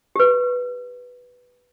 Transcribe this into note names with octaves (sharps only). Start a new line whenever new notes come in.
G4 B4